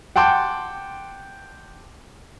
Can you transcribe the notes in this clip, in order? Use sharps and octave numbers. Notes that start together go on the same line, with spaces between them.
F#5 G5 A5 C6 D6